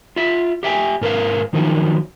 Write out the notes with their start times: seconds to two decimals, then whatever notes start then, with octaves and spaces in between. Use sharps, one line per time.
0.16 F4 E5
0.63 G4 E5 G5 G#5
1.01 G#2 A#4 B4 F5
1.53 D#3 F3 F#3 D#4